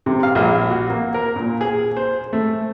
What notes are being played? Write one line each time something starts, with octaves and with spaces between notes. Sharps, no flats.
C3
F5
A#1
F#4
A#3
A#4
A#2
G#4
C5
A3